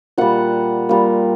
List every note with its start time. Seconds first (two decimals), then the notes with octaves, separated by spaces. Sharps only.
0.18 A#2 G3 F#5
0.89 A#2 G3